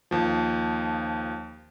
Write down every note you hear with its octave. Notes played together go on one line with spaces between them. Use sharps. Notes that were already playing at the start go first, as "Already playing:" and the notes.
D#2 F3